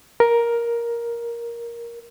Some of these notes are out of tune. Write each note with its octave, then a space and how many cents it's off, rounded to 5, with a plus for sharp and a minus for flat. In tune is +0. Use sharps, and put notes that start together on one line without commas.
A#4 +10